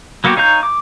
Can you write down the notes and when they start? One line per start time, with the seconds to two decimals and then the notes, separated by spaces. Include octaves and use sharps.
0.24 F#3 A#3 B3 F#4 G4
0.37 D#4 C#5 F5 A#5 G6
0.63 D6